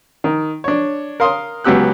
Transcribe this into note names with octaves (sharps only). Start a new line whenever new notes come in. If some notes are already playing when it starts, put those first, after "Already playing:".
D#3
D4 C#5
A#4 F5 C6 D#6
C#2 F#3 B3 G4 E6 F#6